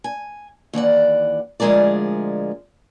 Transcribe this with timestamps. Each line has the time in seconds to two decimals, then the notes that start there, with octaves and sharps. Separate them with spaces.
0.04 G#5
0.73 D#2 E3 D5 F#5
1.60 D2 F3 G#3 G#4 A#4 D5